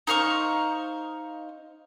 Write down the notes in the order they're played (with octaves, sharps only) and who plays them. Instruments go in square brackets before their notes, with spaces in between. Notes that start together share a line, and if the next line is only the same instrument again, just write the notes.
[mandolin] D#4 C5 F5 C#6